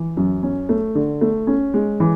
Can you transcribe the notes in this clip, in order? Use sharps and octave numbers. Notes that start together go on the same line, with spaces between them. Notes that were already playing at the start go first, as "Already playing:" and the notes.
Already playing: E3
F#2
C#4
A3
D3
A3
C#4
G#3
E3